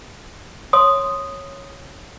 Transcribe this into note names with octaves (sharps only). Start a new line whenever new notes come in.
C#5 C6 D#6